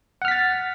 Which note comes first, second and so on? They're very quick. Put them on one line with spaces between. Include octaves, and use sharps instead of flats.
F#5 F6 B6 A6